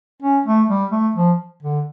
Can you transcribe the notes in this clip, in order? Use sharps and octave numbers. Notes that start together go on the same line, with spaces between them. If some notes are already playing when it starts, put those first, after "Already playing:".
C#4
A3
G3
A3
F3
D3